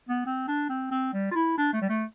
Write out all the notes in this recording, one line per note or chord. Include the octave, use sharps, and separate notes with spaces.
B3
C4
D4
C4
C4
G3
F4
E4
D4
A3
G3
A3